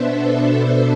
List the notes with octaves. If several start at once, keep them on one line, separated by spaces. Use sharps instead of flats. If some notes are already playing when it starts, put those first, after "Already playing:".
Already playing: B2 B3 D4 B4 C5 E5
A4